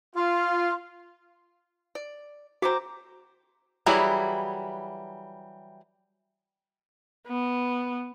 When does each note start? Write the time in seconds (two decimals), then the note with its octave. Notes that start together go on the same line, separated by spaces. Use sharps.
0.16 F4
1.95 D5
2.62 F#3 C4 F#4 C5 A#5 D6
3.86 E3 F#3 G3 E4 G#4
7.27 B3